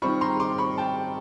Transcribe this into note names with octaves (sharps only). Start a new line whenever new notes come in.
D#3 G3 C4 F4 B5 C#6
A#5 C6
C6 D6
B5 C#6
G5 A5